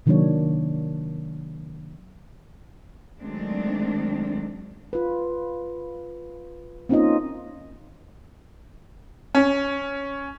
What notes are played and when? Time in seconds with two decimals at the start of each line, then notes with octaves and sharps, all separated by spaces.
0.06 C3 D#3 F#3 A#3 D4 C#5
3.21 D#3 F#3 G#3 A3 C4 D4
4.93 F4 B4
6.89 A#3 C4 C#4 D#4 F4 D#5
9.35 C#4